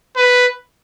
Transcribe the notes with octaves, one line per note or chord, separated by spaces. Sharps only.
B4